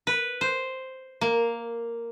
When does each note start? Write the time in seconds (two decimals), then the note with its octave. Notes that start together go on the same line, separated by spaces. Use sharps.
0.07 B4
0.41 C5
1.21 A#3